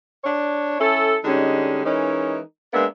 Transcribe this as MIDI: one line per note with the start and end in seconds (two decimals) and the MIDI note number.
0.24 0.80 62
0.24 0.80 73
0.80 1.16 61
0.80 1.16 64
0.80 1.16 69
1.24 1.83 50
1.24 1.83 55
1.24 1.83 56
1.24 1.83 61
1.24 1.83 63
1.84 2.40 52
1.84 2.40 56
1.84 2.40 61
1.84 2.40 63
1.84 2.40 70
2.73 2.85 56
2.73 2.85 58
2.73 2.85 59
2.73 2.85 62
2.73 2.85 76